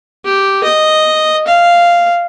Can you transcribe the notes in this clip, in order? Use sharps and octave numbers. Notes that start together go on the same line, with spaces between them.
G4
D#5
F5